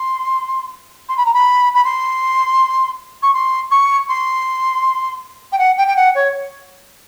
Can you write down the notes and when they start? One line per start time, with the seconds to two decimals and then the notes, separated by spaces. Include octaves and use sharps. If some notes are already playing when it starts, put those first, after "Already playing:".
Already playing: C6
1.09 C6
1.17 B5
1.25 A#5
1.34 B5
1.74 B5
1.85 C6
3.22 C#6
3.34 C6
3.71 C#6
4.09 C6
5.52 G5
5.58 F#5
5.77 G5
5.87 G5
5.96 F#5
6.15 C#5